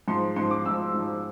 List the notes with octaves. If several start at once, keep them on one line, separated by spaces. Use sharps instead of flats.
G#2 F3 C6
G#2 C6
F3
D6
G#2 F3 E6
G#2 F3